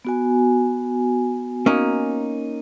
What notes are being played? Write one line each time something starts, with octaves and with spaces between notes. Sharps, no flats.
B3 F#4 G#5
A#3 C#4 D#4